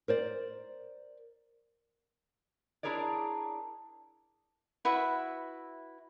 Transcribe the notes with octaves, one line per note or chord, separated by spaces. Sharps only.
A#4 C5 D5
D4 E4 G#4 A#4 C#5 D5
E4 F#4 B4 E5